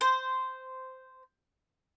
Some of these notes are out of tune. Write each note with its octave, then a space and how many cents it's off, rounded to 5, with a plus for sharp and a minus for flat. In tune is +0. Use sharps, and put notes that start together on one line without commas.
C5 -10